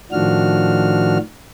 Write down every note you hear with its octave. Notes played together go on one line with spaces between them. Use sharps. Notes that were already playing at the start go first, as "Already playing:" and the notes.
A2 D#3 F3 D4 F#4 F6